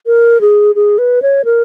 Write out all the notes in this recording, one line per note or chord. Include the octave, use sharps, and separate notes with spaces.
A#4
G#4
G#4
B4
C#5
A#4